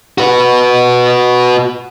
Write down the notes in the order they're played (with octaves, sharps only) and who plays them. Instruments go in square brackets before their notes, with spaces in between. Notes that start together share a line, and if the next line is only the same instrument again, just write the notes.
[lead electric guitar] F#4 B4